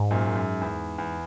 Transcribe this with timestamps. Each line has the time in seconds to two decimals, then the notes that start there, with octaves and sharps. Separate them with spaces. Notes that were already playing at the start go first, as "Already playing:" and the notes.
Already playing: G#2
0.11 F#2 A#2
0.36 F#2
0.61 E2
0.98 E2